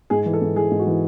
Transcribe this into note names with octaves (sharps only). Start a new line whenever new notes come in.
G#2 G#4
E3
A4
G#2
E3 G#4
G#2
F#4
E3